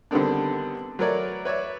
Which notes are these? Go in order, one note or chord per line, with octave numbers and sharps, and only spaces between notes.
D3 D#3 G3 B3 C4 D4
F#3 A3 A#4 B4 C#5 D5
B4 C#5 D5 E5